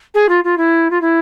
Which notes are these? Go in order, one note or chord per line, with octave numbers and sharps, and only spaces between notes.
G#4
F4
F4
E4
F4
E4